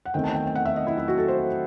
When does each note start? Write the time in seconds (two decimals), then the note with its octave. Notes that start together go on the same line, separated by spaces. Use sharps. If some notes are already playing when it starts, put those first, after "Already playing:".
0.05 F#5
0.14 E2 D#3 A3 C4 G5
0.24 A5
0.34 G5
0.47 G5
0.55 F#5
0.65 E5
0.77 D#5
0.87 E4
0.98 E4
1.08 F#4
1.18 A4
1.28 C5